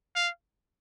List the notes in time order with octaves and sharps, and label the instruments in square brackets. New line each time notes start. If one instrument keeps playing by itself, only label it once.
[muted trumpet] F5